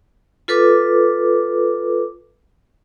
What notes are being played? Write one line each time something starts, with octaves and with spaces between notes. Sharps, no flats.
F4 A4 B4 D6